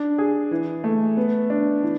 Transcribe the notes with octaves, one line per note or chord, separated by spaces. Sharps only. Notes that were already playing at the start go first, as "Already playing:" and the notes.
Already playing: D4
G#4
E3
A3
B3
D4
E3